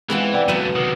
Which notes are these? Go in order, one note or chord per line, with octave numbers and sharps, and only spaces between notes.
E3 G#3 B3 C4 F4
D5 F#5 G5
C#2 F#3 A3 B3 D#7
C3 D#3